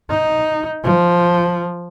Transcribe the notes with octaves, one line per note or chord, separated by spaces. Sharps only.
D#4
F3